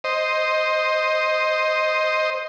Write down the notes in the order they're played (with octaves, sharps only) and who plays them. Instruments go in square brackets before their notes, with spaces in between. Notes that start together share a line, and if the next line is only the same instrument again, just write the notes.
[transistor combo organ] C5 D#5